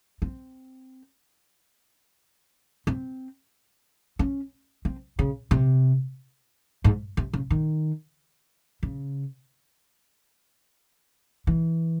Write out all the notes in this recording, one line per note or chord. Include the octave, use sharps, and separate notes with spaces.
C4
C4
C#4
C4
C#3
C3
G#2
C3
C#3
D#3
C#3
E3